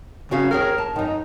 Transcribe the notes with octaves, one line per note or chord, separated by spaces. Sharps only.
C#3 C#4 F#4 F5
D#2 G#4 A#4 C#5
A5
F#2 D#3 D#4